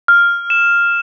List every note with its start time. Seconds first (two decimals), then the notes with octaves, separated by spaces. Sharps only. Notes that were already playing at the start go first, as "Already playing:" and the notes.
0.08 F6
0.50 E7